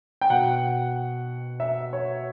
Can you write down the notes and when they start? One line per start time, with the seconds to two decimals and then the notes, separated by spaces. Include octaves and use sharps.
0.21 G5
0.30 B2 F#5
1.60 E5
1.93 C#5